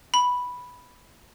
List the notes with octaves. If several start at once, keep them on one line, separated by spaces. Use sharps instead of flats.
B5